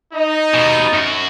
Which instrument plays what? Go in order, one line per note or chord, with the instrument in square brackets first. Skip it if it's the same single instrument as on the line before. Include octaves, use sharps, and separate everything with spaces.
[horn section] D#4
[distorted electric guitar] D#2 B2
F#2 F#4